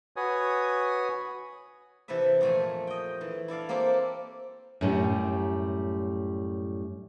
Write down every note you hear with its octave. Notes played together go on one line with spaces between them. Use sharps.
F#4 B4 C#5 G#5 D#6
C3 E3 A4 B4 E5
F2 A#2 A3 A4 G#5
D#5 G5
E3
E4 A4 D5 F5
A#3 C4 G4 A4 D5
F#2 A2 G3